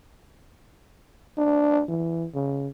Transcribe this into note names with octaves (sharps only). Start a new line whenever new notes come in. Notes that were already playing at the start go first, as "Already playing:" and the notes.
D4
E3
C#3